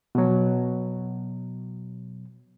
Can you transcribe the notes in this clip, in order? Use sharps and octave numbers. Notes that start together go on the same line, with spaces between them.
B2 F#3